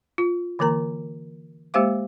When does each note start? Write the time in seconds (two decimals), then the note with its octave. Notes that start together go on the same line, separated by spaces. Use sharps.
0.18 F4
0.59 D3 E3 A#3 A#4 A#5
1.74 G#3 A#3 G4 C5 F5 D6